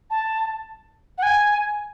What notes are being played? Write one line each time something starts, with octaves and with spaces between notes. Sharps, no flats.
A5
F#5
G#5